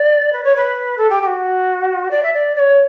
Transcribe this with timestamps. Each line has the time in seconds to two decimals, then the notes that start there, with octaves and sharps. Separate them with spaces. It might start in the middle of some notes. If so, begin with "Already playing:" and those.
Already playing: D5
0.32 B4
0.43 C#5
0.56 B4
0.97 A4
1.09 G4
1.21 G4
1.26 F#4
2.10 D5
2.22 E5
2.33 D5
2.55 D5
2.59 C#5